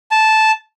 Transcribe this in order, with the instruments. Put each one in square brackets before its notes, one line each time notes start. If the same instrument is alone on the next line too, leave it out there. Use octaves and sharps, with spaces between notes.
[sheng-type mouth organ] A5